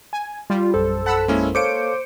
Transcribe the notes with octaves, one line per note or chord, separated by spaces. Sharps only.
G#5
G3 F4
A#1 F#2 A4 C5
F#5 A5 B5 E6
G#3 A#3 C#4 E4
A4 C5 C#5 F5 D6 C#7 D7